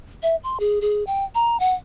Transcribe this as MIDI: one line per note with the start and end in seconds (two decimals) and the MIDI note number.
0.23 0.36 76
0.44 0.60 84
0.60 0.79 68
0.81 1.04 68
1.07 1.24 79
1.35 1.59 82
1.60 1.74 78